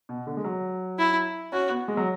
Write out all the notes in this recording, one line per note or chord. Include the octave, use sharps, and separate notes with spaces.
B2
D3
G#3
F#3
E4
C#4 F#4
B3
G#3
F#3